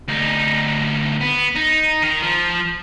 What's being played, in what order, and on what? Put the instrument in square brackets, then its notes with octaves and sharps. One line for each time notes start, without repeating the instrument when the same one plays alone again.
[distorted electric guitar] D2 D#4
B3
D#4
D#3 A#4
F3